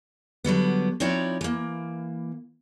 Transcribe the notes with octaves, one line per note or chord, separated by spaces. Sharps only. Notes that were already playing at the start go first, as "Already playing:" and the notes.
D3 F#3 G3 B3
F3 C4 D#4 E4 C#5 D5
E3 A#3